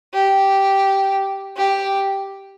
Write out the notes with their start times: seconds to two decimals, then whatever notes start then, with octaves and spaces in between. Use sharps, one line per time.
0.14 G4
1.57 G4